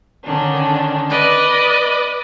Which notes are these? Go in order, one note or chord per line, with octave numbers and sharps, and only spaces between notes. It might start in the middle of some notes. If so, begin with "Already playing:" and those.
D3 D#3 C#4 D4
B4 D5 D#5